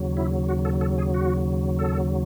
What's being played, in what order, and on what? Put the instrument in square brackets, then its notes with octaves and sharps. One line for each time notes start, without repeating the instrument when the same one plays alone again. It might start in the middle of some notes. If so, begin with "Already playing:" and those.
Already playing: [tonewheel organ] D#2 C#3 F#3
E4
F#4
A4
A4
G#4
F#4
A4